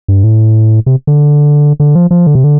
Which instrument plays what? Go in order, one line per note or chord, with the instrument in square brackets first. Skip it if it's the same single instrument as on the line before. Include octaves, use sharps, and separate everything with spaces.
[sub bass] G2
A2
C3
D3
D3
F3
F3
D3
C3
D3